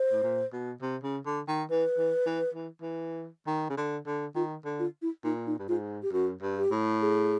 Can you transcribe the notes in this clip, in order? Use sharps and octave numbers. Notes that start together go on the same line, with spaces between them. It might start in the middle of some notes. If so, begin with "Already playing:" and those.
Already playing: C5
A2
A#2
B2
C3
C#3
D3
D#3
E3 B4
E3
E3
E3
E3
D#3
C#3
D3
D3
D#3 F4
D3
F4
E4
A#2 D#4
D#4
G2
G#2 F4
G4
F#2 F#4
G2
G4
A2
G#4